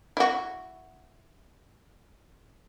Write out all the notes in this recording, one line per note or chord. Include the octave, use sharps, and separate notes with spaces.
E4 F#4